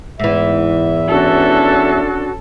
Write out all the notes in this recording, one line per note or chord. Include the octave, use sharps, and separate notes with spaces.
E2 G#2 E3 E5
C#4 D4 F#4 A4